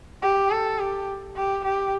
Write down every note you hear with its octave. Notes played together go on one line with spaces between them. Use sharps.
G4
A4
G4
G4
G4